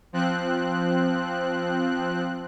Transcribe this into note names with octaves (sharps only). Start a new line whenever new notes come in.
F3 C4 F#6